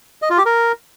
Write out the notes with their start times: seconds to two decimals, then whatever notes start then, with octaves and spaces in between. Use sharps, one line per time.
0.22 D#5
0.30 F4
0.38 G4
0.46 A#4